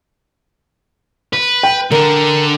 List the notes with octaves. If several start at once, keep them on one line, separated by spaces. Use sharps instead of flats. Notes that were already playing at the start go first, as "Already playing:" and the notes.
B4
G5
D3 D4 A#4